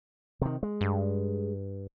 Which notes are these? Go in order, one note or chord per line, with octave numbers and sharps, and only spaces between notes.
C3 D#3
G#3
G2